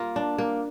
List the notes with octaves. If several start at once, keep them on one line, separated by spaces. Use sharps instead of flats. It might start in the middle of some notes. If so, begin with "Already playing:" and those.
Already playing: A#3 F4
D4
A#3